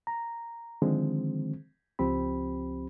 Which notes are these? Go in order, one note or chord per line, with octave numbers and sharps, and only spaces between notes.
A#5
D3 D#3 F3 G#3 C4
C#2 F3 C4 G4 B5